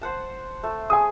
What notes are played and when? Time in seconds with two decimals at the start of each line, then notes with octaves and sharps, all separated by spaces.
0.01 C5 F#5 A5
0.63 A3
0.90 G#4 G#5 D#6